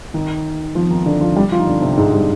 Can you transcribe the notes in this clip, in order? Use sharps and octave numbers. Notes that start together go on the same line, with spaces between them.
D#3 D#4
F3 F4
D#3 D#4
D3 D4
F3 F4
G3 G4
F3 F4
D#4
D3 D4
C3 C4
G#2 G#3
G3